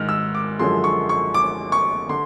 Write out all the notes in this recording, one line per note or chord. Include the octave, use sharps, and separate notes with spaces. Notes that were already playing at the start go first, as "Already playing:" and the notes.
Already playing: G#2 D#3 F6
E6
D6
F#2 D3 F3 G#3 C6
C#6
C#6
D6
C#6
D3 C6